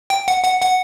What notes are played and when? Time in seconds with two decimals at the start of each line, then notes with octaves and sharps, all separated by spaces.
0.10 G5
0.28 F#5
0.44 F#5
0.62 F#5